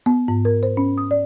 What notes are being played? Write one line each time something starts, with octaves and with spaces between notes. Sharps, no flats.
B3
G#2
A#4
C5
C#4
D#6
D5